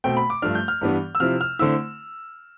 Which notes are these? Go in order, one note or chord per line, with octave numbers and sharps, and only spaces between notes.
B2 A3 C4 G5
B5
D6
G2 F3 A3 D4 F6
G6
F6
G2 E3 G3 B3 D4
E6
C3 F3 C4 E4 F6
F6
D3 A3 C4 E4 E6